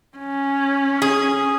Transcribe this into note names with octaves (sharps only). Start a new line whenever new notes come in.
C#4
G#4